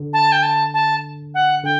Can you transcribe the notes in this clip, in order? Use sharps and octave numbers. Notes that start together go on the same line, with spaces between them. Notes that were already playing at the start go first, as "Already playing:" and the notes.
Already playing: D3
A5
G5
A5
A5
F#5
D3 G5